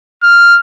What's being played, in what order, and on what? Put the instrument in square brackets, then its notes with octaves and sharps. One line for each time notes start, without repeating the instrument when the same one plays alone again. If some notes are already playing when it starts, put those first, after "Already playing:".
[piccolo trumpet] F6